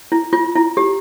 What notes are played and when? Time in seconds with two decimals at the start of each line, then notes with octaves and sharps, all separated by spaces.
0.12 E4
0.33 F4
0.56 E4
0.77 G4